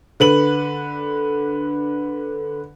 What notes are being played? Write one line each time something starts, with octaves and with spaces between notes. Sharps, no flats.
D3 B4 F#7